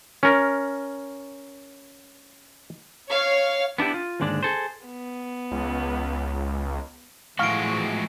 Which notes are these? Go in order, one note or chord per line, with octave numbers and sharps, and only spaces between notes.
C#4 A#4
C#5 F5
B3 D4 E4 G4
F4
D#2 G#2 D3 G#3 D4
G#4 A4 C5
B3
C#2
A2 E3 F3 G#3 F#4 F5 C#6 D7